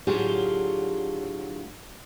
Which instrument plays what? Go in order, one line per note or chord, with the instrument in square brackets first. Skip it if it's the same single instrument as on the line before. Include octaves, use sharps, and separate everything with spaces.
[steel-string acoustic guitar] A2 D3 F#3 F4 G4 G#4